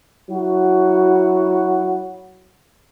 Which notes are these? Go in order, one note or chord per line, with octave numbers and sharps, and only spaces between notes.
F#3 E4 F#4